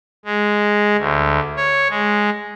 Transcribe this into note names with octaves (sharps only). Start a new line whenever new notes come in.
G#3
D2
C#5
G#3